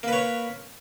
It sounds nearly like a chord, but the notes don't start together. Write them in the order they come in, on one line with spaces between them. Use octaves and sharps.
A#3 B4 C#5